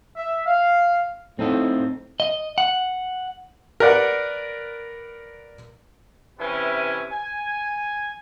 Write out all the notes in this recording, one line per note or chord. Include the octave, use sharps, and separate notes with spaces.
E5
F5
A2 C4 D#4 A4
D#5
F#5
A#4 B4 D5 F#5
C3 E3 C#4 E4 B4 G#5
G#5